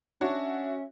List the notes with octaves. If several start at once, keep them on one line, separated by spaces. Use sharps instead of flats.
C#4 D4 F#4 C#5 E5